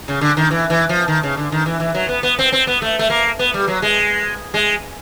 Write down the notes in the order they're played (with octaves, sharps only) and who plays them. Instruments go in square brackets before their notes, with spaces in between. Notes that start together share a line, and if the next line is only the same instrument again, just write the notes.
[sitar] C#3
D3
D#3
E3
E3
F3
D#3
C#3
D3
D#3
E3
E3
F#3
B3
B3
C4
C4
B3
A3
A3
A#3
B3
G3
F#3
G#3
G#3